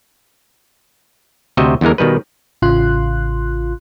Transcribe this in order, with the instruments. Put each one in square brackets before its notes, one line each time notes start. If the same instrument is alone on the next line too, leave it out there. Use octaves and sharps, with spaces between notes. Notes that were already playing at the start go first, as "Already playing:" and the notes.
[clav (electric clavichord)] D2 C3 F#4 D#5 E5 G5
E2 D3 E3 G#3 A#4
B2 D#3 G3 B4
[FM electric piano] A1 C#3 F4 C6 F#6